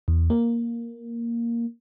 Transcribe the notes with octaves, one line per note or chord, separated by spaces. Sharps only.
E2
A#3